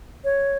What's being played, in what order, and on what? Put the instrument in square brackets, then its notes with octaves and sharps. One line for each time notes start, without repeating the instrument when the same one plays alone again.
[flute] C#5